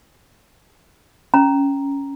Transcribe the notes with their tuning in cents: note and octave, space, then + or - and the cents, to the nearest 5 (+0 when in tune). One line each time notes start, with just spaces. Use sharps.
C#4 +0 A#5 +0